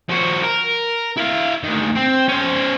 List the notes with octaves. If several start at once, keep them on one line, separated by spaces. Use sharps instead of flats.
F3 F#4
A#4
E4 F5
D2 D#3
C4
C#4 C5